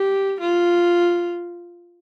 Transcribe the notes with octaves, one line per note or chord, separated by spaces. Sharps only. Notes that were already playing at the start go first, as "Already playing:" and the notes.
Already playing: G4
F4